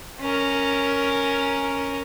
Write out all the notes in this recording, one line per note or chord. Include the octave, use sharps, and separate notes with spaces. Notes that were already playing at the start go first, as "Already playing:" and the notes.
C#4 A#4